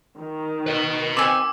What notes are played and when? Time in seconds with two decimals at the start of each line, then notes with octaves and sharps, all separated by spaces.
0.20 D#3
0.66 B4 D#5
1.17 C4 G4 G#5 D6 E6